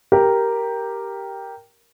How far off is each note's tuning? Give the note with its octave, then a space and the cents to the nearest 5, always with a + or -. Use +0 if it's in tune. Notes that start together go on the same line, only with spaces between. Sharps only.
G4 +0 A#4 +0